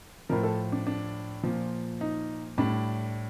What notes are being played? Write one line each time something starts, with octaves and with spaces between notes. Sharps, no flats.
A2 F3 A#4
A4
D4
D4
A#2 F3
D#4
A2 G3 D4